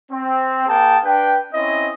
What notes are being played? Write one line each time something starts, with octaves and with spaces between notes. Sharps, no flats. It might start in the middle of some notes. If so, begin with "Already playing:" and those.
C4
A#3 G#4 G5 A5
D4 B4 G5
C4 C#4 E4 D#5